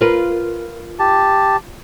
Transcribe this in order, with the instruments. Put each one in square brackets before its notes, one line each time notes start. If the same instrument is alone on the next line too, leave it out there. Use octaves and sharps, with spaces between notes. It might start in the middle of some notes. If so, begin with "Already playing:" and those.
[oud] F4 A#4 B4
[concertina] G4 A5